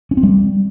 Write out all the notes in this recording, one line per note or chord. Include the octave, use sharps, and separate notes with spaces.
C#4
C4
G3